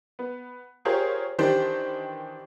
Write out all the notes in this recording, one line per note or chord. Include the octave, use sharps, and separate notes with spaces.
B3
F4 G4 G#4 A#4 C5 C#5
D#3 E3 D4 G4 C5